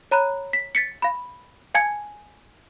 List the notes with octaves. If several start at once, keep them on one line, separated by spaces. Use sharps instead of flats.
C#5 A#5 B5 F#6
B6
A6 B6 C#7
F5 B5
F5 G#5 A5 G#6 C#7